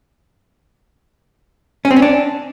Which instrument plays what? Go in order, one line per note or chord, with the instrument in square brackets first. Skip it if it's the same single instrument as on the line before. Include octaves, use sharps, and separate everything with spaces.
[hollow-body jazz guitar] C#4
C4
C#4
D4